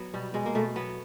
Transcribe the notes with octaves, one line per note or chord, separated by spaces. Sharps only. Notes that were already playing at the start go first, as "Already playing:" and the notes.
Already playing: F#3 B3
B2 G3
B2 G#3
A#3
B2 A3
F#3 B3